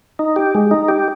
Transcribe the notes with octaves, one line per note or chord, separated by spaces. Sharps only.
D#4
G4
G#3
D#4
G4